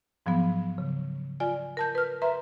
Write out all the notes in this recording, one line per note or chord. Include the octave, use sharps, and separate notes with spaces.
G#2 F3 F#3 B3
C#3
F4 D5 G#5
A#4 A5 G6
B4 F6
B4 E5 A#5 C6